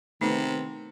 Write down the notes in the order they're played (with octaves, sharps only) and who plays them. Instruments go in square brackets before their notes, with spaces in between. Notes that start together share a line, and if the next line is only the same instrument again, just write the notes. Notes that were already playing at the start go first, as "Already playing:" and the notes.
[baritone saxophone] C3 [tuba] D#3 [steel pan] A3 B3 [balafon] D#4